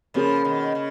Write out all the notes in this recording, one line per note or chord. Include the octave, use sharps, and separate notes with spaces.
C#3 F3 A#3 C#4 G#4
B2 D#3
C#3